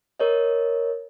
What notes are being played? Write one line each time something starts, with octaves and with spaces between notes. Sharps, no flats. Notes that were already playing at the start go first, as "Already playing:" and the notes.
A#4 C#5 D#5